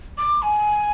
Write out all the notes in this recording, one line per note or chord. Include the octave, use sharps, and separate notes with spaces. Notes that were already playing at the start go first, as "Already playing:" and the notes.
D6
G#5